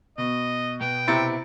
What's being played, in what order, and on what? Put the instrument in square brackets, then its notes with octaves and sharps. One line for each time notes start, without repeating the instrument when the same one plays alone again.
[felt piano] B2 [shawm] D#5
[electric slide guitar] B2 B3 [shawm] G5
[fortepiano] C3 C4 E4 [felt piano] A#5 A6 C#7